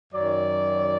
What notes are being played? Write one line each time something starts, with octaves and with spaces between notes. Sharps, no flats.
F#2 D#3 F#3 D5